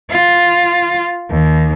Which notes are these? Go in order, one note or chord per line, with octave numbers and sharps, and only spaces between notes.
F4
D#2